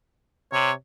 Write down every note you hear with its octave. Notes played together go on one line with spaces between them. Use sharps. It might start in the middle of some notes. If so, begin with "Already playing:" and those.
C3 C#5